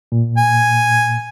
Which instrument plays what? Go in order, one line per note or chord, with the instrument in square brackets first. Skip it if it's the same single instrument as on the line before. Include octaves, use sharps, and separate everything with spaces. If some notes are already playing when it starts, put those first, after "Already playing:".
[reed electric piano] A#2
[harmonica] G#5